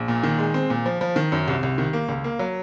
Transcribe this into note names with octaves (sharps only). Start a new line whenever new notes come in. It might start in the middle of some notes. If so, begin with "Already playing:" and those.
Already playing: A#1
A#2
D#3
G#3
C4
A#2
F3
F3
D#3
F#2
C2
C2
D#3
A#3
C#2
A#3
F#3